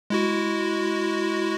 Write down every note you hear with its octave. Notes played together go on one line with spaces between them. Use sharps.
G#3 E4 F#4